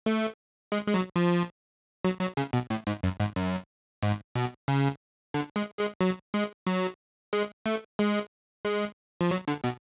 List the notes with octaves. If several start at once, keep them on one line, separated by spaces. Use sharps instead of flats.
A3
G#3
G#3
F#3
F3
F#3
F#3
C#3
B2
A2
G#2
F#2
G#2
F#2
G#2
B2
C#3
D3
G#3
G#3
F#3
G#3
F#3
G#3
A3
G#3
G#3
F3
F#3
D3
B2